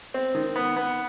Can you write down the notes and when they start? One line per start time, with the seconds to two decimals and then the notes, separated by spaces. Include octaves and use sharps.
0.14 C4
0.35 D#3
0.56 B3
0.77 B3